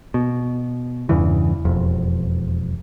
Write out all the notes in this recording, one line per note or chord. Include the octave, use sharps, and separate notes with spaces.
B2
E2 G2 C#3 E3
E1 F2